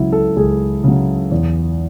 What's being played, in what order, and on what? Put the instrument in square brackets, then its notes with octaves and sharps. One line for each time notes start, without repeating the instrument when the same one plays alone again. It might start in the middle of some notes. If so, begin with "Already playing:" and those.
Already playing: [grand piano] C#2 C#3 F#3 E4
A4
C#2 G#4
C#3 F#3
E2